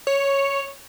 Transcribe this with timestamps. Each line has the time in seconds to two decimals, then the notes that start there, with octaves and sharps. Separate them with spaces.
0.07 C#5